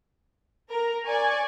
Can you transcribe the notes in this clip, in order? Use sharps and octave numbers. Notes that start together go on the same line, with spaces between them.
A#4 A#5
D5 G#5 C#6